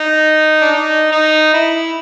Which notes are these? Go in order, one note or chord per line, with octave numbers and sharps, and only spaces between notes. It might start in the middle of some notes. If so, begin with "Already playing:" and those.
Already playing: D#4
D4
D#4
D#4
E4